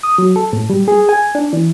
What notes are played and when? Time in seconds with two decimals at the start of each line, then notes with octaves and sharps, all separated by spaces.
0.03 D#6
0.18 F#3
0.36 A4
0.53 A2
0.70 G3
0.88 G#4
1.09 G#5
1.35 D4
1.53 E3